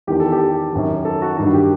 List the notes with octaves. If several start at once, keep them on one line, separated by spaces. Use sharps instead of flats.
E2 D#3 G4
A4
G4
F#2 D#3
A4
F#4
G2 D#3 F#4
G4